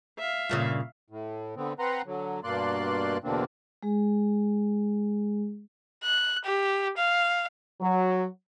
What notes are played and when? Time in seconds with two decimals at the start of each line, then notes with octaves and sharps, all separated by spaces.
0.18 E5 F5
0.49 G2 A#2 C#3
1.10 A2
1.56 D3 B3 C4
1.79 C4 B4 F#5 A#5 C6
2.06 D3 F#3
2.44 G2 B2 A#3 D5 C6 F#6
3.24 E2 B2 D3 A#3 C4 D4
3.82 G#3 G#4
6.04 F#6
6.45 G4
6.97 F5
7.81 F#3